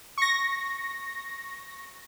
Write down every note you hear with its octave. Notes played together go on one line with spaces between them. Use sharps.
C#6 A#6